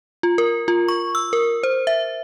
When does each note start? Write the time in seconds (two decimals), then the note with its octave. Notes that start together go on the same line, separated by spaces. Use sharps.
0.23 F4
0.38 A#4
0.68 F4
0.88 C#6
1.15 E6
1.33 A#4
1.63 C5
1.87 E5